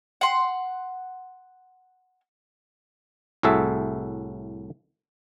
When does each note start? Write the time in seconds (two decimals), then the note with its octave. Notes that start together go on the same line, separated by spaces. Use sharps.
0.21 F#5 C6
3.43 C2 A2 F#4 G#4 A4 E5